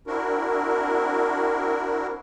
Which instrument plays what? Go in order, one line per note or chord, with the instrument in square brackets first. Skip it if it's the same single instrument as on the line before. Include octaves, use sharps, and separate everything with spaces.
[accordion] C4 D4 E4 F#4 A#4